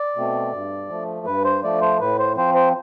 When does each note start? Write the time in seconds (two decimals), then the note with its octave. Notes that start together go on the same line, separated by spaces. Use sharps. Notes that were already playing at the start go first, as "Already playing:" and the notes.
Already playing: D5
0.16 B2 A3 C4
0.53 G2
0.89 F3 A3
1.26 G2 B4
1.44 C5
1.63 F3 A3 D5
1.81 C5
1.99 A2 B4
2.19 C5
2.36 F3 C4 C5
2.55 C5